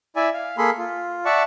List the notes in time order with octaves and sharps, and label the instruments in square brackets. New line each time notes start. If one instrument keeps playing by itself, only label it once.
[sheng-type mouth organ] E4 D5 E5 G#5
F5
A#3 G#4 A4 B5 C6
F4
D5 E5 F#5 A5 C#6